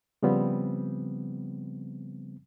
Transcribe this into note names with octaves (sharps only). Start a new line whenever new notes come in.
C#3 F3 G3 B3 C4